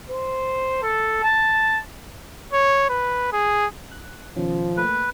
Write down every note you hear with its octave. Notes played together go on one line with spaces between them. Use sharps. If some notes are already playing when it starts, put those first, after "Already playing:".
C5
A4
A5
C#5
B4
G#4
F#6
B2 D#3 F3 C#4
A3 A#3 B4